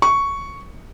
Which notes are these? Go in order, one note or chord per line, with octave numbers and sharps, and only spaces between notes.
C#6